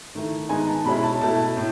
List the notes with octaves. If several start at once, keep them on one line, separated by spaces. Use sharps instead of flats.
D#3 A3 E4
D#3 G#3 B3 D#4 G#5
A5
B2 G#3 C#4 E4 B5
A5
B2 A3 E4 A5
A2